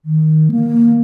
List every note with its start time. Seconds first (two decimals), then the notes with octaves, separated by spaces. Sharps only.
0.05 D#3
0.51 A#3